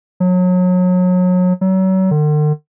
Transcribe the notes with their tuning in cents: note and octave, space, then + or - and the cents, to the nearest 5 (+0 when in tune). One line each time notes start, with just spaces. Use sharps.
F#3 -30
F#3 +35
D3 +45